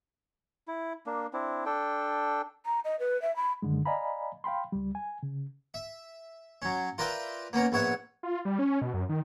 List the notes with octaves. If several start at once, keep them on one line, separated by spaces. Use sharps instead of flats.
E4
A#3 D4
C4 D4 E4
D4 A4 G5
A#5
D#5
B4
E5
B5
F#2 D3 D#3 G#3
D5 D#5 F5 G#5 A#5 B5
F5 G5 B5 C6
C#2 G3
G#5
C#3
E5
F#3 C#4
F4 A#4 B4 D5 E5 G5
A#3 B3 C#4 A#4
A#1 B3 C#5 E5 F#5
F4
G3
C#4
B2
F#2
D#3